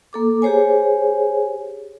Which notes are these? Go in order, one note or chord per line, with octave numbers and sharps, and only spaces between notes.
A#3 A4 D6
G4 G#4 C5 C#5 G#5